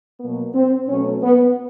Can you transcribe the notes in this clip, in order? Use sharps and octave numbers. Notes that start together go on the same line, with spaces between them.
B2 F#3 A#3 B3
C4
B2 F#3 A3 C#4
B3